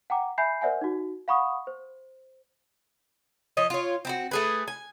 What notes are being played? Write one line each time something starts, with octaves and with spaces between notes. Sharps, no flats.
F#5 G5 A#5 D6
E5 G#5 B5 G6 C7
A#4 C5 D5 E5 F#5 G#5
D#4 F#4
F5 F#5 B5 C#6 D#6
C5
F3 C#5 D#5
F4 C#5
C4 E4 F#4
A3 G#4 B4
G#5